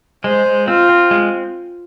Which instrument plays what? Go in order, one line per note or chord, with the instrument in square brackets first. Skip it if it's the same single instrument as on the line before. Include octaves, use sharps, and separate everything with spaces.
[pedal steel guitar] G#3 [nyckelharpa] C5
[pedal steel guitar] G#3
[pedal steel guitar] C4 [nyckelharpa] F4
[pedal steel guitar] C4
G#3